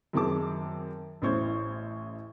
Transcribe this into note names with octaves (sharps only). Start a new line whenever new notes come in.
F#2 D#3 C4 G#4 A5 D6
A1 A2 C#4 C5 C#6 G#6